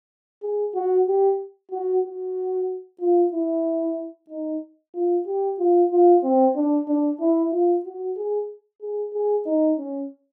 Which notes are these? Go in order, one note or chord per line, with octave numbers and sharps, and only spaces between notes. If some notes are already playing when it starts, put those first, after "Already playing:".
G#4
F#4
G4
F#4
F#4
F4
E4
D#4
F4
G4
F4
F4
C4
D4
D4
E4
F4
F#4
G#4
G#4
G#4
D#4
C#4